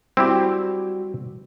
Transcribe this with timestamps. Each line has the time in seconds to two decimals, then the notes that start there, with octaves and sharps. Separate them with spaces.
0.17 G3 C4 E4 F#4 G4